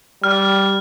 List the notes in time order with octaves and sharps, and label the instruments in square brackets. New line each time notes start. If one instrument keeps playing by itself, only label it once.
[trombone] G3 [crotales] F6